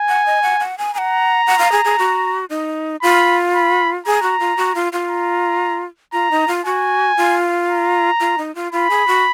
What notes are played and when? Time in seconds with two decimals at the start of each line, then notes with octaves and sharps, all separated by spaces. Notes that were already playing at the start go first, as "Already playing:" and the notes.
Already playing: G#5
0.09 F#5
0.26 D#5
0.43 F#5
0.60 F#5
0.78 G#5
0.94 G#5 A#5
0.98 F#5
1.47 F#5
1.59 F5
1.72 G#4
1.85 G#4
1.99 F#4
2.50 D#4
3.02 F4 B5
3.54 B5
4.06 G#4 A#5
4.23 F#4
4.40 F4
4.57 F#4
4.75 F4
4.93 F4
5.09 A#5
6.13 F4 A#5
6.31 D#4
6.48 F4
6.65 F#4 G#5
7.17 F4
7.69 A#5
8.20 F4
8.38 D#4
8.55 F4
8.72 F4 B5
8.90 G#4
9.08 F#4